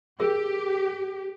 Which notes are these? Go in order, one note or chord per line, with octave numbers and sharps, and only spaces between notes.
G4 G#4 A#4 E5